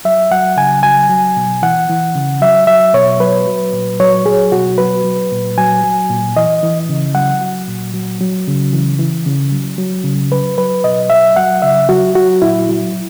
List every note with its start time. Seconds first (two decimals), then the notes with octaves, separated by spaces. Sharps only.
0.05 F#3 E5
0.31 F#3 F#5
0.57 C#3 G#5
0.83 F#3 G#5
1.09 F#3
1.37 B2
1.62 E3 F#5
1.89 E3
2.15 C#3
2.41 F#3 E5
2.67 F#3 E5
2.94 B2 C#5
3.20 F#3 B4
3.47 F#3
3.73 A#2
4.00 F#3 C#5
4.26 F#3 G#4
4.52 B2 F#4
4.78 F#3 B4
5.04 F#3
5.32 A#2
5.58 F#3 G#5
5.83 F#3
6.10 A#2
6.36 E3 D#5
6.63 E3
6.89 C#3
7.15 F#3 F#5
7.41 F#3
7.68 A#2
7.94 F#3
8.21 F#3
8.47 C#3
8.73 E3
8.99 E3
9.26 C#3
9.52 F#3
9.78 F#3
10.04 C#3
10.31 F#3 B4
10.58 F#3 B4
10.84 B2 D#5
11.10 F#3 E5
11.36 F#3 F#5
11.62 C#3 E5
11.89 F#3 F#4
12.15 F#3 F#4
12.42 A#2 E4
12.69 F#3